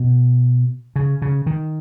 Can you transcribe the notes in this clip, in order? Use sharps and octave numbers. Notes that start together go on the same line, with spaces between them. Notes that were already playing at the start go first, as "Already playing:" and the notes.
Already playing: B2
C#3
C#3
D#3